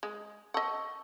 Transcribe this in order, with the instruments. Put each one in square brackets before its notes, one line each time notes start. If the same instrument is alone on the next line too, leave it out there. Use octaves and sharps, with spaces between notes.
[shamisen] G#3
[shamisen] D#5 F#5 [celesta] A5 C#6 E6